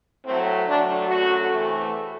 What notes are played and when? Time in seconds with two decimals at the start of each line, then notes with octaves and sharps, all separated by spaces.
0.25 A2 F#3 A3 C4
0.66 D2 D3 F#3 A3 D4
1.07 F#2 F#3 A3 F#4
1.49 E2 C3 E3 A3